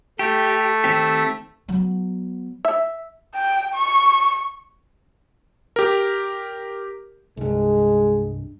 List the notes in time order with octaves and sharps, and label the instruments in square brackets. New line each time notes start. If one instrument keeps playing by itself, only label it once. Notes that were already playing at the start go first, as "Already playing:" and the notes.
[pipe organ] A3 [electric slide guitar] G4
[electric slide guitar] D#3 C4 G4
[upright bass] F#3 B3
[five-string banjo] E5
[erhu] G5
C#6
[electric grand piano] G4 A#4
[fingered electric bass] C2 G2 [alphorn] G#3